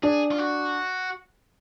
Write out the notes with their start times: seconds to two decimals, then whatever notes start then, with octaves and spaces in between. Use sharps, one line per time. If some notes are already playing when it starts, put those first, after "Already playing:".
0.03 D4 G#4
0.31 F4
0.38 F#4